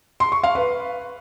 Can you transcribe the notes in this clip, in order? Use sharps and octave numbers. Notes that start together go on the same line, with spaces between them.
C6
C#6
F5
B4